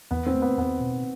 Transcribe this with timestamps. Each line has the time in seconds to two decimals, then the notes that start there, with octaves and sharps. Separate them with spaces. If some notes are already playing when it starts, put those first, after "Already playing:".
0.11 E2 B3
0.26 C4
0.34 A3
0.42 B3
0.57 E2 B3
0.80 B2